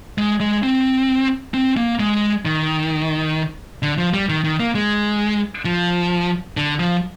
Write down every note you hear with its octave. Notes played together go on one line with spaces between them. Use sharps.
G#3
G#3
C4
C4
A#3
G#3
D#3
D3
F3
G3
D#3
D#3
A#3
G#3
F3
D3
F3